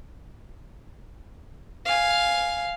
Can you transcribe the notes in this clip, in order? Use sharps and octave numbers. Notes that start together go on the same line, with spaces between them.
F5 G#5